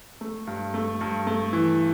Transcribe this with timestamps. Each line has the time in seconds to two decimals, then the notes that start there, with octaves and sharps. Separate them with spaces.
0.21 A3
0.47 G2
0.74 A3
1.01 G2
1.27 A3
1.53 E3